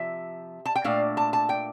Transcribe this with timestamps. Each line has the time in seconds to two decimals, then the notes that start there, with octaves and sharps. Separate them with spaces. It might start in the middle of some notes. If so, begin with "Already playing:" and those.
Already playing: C3 F3 E5
0.66 A5
0.76 G5
0.84 A#2 A3 D4 F5
1.17 A5
1.33 A5
1.49 G5